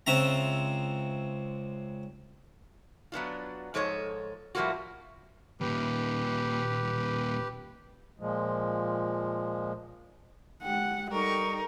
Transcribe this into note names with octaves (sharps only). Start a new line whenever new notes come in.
C#2 C4 E5 A#5
F#3 B3 D4 F4
G#2 F3 A4 C#5 D#5
A2 F3 G3 A#3 F4 F#4
D#2 A#2 G4 B4
A#2 F3 G#3
G#3 G4 F#5 G5
G3 D#4 A4 A#4 C#6